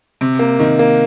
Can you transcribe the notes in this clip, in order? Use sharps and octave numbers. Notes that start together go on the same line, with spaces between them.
C3
A#3
D#3
A#3